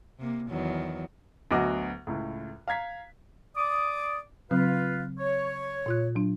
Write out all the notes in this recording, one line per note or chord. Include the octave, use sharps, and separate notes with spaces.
C3 A#3
E2 D#3 F#3
D2 F#3 B3 F#4 D#5 D6
C#2 A2
F5 A#5 G#6 B6
D5 D6 D#6
C#3 F#3 C4 F4 B4 F5
C#5
A#2 F4 F#6
F#3 D4